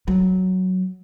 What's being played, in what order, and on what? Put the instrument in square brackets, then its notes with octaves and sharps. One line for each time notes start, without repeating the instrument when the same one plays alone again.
[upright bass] F#3